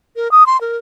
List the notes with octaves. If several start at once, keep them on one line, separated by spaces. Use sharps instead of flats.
A#4
D#6
C6
A#4